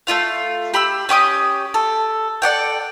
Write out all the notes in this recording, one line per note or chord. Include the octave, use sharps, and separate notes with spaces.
A3 C#4 F4 F5
G4 B5 E6
C#4 G4 D6 D#6
A4
A4 D5 F#5 G5